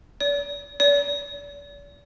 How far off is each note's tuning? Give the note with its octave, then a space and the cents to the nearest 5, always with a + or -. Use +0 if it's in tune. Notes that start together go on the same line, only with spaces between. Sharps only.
D5 -45
D5 -45